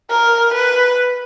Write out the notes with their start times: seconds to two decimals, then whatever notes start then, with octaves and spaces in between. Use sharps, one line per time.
0.10 A#4
0.54 B4